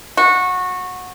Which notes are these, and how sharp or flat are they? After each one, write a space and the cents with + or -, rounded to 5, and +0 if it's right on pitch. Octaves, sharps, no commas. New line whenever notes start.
F#4 -20